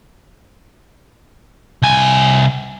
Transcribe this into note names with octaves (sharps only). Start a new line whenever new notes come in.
C2 G#5